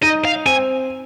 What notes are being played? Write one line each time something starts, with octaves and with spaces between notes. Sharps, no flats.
D#4 D#5
F5
C4 G#5